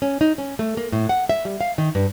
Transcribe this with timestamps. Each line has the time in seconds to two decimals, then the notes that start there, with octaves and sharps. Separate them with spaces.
0.02 C#4
0.21 D#4
0.38 C#4
0.59 A3
0.77 A#3
0.92 A2
1.09 F#5
1.29 E5
1.45 G3
1.61 F5
1.78 D#3
1.95 G2